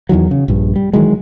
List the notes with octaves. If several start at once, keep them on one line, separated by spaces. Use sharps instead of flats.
E2 D#3 E3 F#3
C#3
A#1 G2
G3
D#3 E3 F#3 G#3